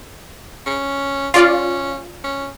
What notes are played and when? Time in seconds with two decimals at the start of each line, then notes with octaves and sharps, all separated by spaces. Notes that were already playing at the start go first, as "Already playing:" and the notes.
0.66 C#4
1.34 C#4 F4 D5 F5
2.24 C#4